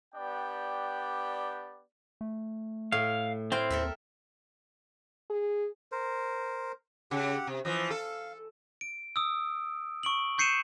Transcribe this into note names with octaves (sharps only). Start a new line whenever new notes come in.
B3 D4 G4 D5 G5
A3
A2 F5
C4 E4 C5 F5 G5
D#2 A4 A#4 E5
G#4
A#4 C5
C#3 G4 F#5
C3
E3 F3 D#5
A4 F5
D7
D#6 E6
C#6 D7 F#7
C#6 G6 C7 C#7 D#7 E7